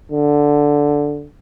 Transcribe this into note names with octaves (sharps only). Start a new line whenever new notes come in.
D3